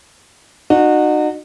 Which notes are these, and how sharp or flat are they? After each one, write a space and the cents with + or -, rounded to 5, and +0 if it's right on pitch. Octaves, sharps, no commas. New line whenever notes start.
D#4 -40 F#4 -15